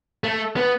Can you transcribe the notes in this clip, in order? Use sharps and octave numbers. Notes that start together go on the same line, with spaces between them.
A3
B3